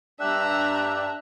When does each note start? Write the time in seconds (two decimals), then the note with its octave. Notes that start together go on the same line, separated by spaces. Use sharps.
0.20 G2 D4 G4 E5 A#5 E6 F#6